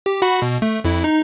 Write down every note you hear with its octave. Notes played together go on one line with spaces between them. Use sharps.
G4
F#4 F#5 B5
B2
A3
F2 E4
D#4